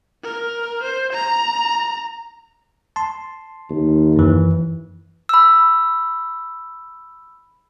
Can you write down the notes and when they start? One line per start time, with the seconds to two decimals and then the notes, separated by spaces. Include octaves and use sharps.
0.23 A#4
0.83 C5
1.13 A#5
2.96 A5 C6
3.70 D#2
4.16 F#2 E3
5.29 B5 E6